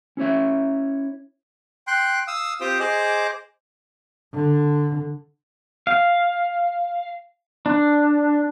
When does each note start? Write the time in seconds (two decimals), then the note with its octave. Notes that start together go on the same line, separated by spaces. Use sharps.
0.17 C#4 E4 C#5 E5
1.87 G5 C6 F#6
2.27 F5 D#6 E6
2.61 C4 F4 G4 C5 G5 D#6
2.80 G#4 C5 D#5 D6
4.34 D3
5.87 F5
7.66 D4